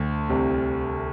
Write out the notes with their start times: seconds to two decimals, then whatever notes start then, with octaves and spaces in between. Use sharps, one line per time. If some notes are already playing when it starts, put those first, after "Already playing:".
Already playing: D2 D3
0.29 C2 C3